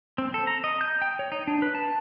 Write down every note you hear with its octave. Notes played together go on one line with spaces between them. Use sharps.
C4
A4
A#5
D#5
G6
G5
C#5
D#4
D4
B4
A5